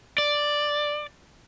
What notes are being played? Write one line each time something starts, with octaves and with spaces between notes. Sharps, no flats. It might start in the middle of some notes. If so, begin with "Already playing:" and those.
D5